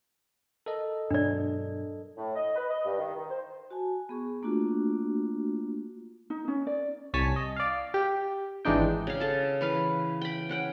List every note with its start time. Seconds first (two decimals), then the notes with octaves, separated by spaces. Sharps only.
0.66 A4 A#4 D#5
1.11 G2 B2 F#3 D4 D5
2.16 A2
2.35 D#5
2.56 B4
2.70 D#5
2.85 G2
2.99 D#3
3.16 D#3
3.29 C5
3.71 F#4 G#5 A5
4.09 B3 G#4 C#6
4.42 A3 A#3 D4 F4 F#4
6.30 D#4
6.48 C#4
6.67 D5
7.14 C2 C#5 G#5 A5 B6
7.36 D#5
7.56 D5 F5
7.94 G4
8.65 G#1 E3 G#3 D4 D#4 G5
9.07 C#3 F5
9.20 A4 A5
9.61 E3 B4 F5
10.21 G5 B5
10.49 C#4 F#5 G5